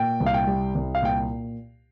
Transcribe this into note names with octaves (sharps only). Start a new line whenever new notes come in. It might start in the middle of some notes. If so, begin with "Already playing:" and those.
Already playing: A#2 G5
C2
F5
G5
G3
C2
F5
A#2 G5